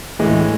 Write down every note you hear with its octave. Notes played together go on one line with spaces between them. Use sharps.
A2 E3 G#3